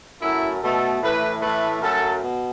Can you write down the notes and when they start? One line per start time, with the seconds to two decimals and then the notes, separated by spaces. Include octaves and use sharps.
0.22 F#2 F#3 A3 E4
0.62 B2 A3 A4
1.02 A2 E3 A3 B4
1.42 A2 E3 A3 B4
1.82 F#2 F#3 A3 A4
2.23 B2